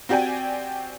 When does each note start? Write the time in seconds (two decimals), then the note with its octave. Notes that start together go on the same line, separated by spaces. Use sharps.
0.09 C4 F#4 G4 D5 G5 G#5